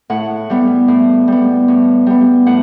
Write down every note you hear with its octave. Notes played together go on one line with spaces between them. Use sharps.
A2 F#5
G3 B3
A2
G3 B3
A2
G3 B3
A2 F#5